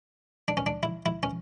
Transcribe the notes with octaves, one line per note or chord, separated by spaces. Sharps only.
D4
C#4
D4
E4
E4
C#4